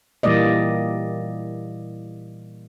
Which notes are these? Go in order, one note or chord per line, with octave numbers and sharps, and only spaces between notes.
A#2 E3 G3 A#3 D5 D#5